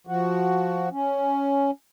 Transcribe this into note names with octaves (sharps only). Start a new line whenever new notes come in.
F3 F#4
C#4